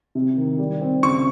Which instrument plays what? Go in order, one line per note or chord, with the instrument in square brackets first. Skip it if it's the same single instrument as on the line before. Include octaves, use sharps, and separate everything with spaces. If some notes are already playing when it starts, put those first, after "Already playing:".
[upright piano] C3
D#3
G3
C4
[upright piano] C#3 [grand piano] C#6